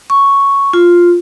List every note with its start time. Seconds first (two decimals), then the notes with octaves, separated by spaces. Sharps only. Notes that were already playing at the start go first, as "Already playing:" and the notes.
0.10 C#6
0.73 F4